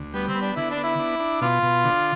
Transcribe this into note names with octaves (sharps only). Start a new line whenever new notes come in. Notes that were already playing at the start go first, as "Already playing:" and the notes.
Already playing: D2
G3 B3
C4
B3
D4
D3 E4
D4
B3
E4
D4
D4
B2 F4
B2
D3